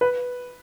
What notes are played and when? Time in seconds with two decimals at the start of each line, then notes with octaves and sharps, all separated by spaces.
0.01 B4